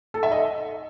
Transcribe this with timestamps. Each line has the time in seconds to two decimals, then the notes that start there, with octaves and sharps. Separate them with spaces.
0.14 A4
0.23 E5
0.31 D#5